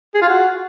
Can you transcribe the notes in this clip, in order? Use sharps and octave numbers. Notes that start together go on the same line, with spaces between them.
G#4
F4
F#4